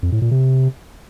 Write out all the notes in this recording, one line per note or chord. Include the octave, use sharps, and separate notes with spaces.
F2
A2
A#2
C3